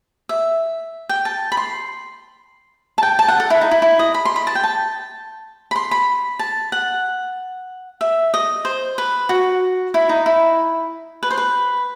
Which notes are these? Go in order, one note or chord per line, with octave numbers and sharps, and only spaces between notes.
E5
G5
A5
B5
C6
A5
G5
A5
F#5
A4
E4
D#4
E4
E4
D#5
B5
C6
B5
A5
G5
A5
B5
C6
B5
A5
F#5
E5
D#5
C5
B4
F#4
E4
D#4
E4
B4
C5
B4